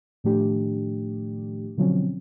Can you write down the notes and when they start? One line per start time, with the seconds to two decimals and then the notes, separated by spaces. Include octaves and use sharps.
0.24 A2 D#3 F3 A3 D4 G4
1.77 B2 D3 F3 F#3 C4 C#4